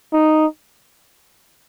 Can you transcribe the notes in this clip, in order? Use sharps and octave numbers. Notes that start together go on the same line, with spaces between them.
D#4